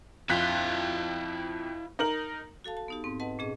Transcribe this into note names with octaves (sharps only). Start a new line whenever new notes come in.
F2 E4 F5 F#6 B6
D#4 A#4 F#7
F#4 A4 F5 A5
A5
B3 D#4 G4
G#2 C4
B4 D#5 F#5 A5
A#2 C#4 G#4 D#5